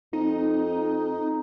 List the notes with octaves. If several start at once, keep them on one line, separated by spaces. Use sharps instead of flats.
F2 C4 D#4